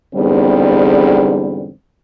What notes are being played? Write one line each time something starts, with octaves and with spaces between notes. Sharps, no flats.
E2 G#2 D3 G3 B3 C4